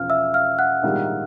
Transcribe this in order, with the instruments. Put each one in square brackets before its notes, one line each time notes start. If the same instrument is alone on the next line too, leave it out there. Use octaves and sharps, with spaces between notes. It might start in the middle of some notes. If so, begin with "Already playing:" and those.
Already playing: [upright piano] E1 E2 C#3 F3 [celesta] F5 F6
[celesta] E5 E6
F5 F6
F#5 F#6
[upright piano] A#1 G#2 D#3 G3